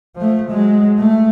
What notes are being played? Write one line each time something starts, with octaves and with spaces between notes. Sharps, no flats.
F3 A3
F#3 G#3
A3